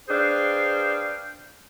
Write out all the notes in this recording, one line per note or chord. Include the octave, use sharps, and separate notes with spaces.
D4 G#4 B4 C5 F5 G5